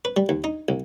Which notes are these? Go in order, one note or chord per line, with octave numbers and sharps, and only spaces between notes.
B4
G3
D#2
D#4
C2